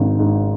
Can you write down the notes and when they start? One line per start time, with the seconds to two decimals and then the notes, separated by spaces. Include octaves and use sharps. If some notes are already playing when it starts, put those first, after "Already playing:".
Already playing: G#1 G#2
0.19 G#2